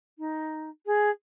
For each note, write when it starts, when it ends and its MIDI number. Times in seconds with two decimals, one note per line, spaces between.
0.19 0.69 63
0.86 1.10 68